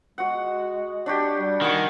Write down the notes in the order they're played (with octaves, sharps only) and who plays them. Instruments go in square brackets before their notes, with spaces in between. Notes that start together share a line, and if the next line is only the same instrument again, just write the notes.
[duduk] G#3 [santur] F#4 F#5
[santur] D4 F#4 G4
[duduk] G3
[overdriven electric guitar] D#3 [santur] F#5 G#5 C#6